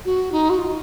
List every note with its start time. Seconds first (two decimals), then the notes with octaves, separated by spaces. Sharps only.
0.05 F#4
0.32 D#4
0.50 F#4
0.58 F4